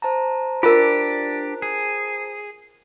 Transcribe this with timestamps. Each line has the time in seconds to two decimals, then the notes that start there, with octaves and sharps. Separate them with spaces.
0.02 C5 A5 A#5
0.63 D4 F4 G4 A#4
1.62 G#4